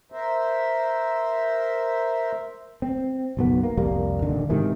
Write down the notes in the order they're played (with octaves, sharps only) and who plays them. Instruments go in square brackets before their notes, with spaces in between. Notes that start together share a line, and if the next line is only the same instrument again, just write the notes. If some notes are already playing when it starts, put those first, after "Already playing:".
[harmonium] A#4 C5 E5
[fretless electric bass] C4
F#1 B1 B3
A#3
C2 F2 G3 A#3
D#1 D3 D#3
G#2 C3 D#3 E3